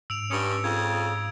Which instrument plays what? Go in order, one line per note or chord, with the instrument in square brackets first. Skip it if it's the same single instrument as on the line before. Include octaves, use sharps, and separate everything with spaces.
[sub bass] G#2 [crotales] E6 D7 F7
[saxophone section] G2 C#4 [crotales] D#6 D7
[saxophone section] F2 C#3 F4 [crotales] G#6